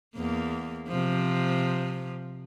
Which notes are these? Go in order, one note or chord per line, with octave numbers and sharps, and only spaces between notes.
E2 A#3
C3 F3